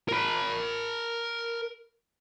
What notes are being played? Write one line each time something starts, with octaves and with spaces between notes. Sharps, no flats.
A#4 B5